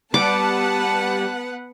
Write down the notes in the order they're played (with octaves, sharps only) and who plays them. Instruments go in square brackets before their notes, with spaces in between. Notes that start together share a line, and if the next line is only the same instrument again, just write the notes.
[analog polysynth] G3 [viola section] B3 B4 F#5 [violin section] A5 [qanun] D6